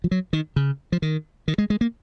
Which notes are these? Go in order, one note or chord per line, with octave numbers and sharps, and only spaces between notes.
F3
F#3
D#3
C#3
F3
D#3
D#3
G#3
G#3
A#3